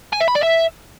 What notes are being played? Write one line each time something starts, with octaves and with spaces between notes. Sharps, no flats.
G#5
E5
B5
D5
E5